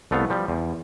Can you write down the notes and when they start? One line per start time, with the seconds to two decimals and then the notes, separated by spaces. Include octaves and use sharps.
0.11 C2 A3 B3 F5
0.30 F3 G3
0.48 E2